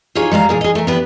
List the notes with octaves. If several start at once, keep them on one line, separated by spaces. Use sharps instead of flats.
D#4 F4 G4 G#4 C#5
G3 G#3 F5 A#5
A#2 G#4 A#4
G#4 D#5
A3 A#4
B3 D4 G4 B4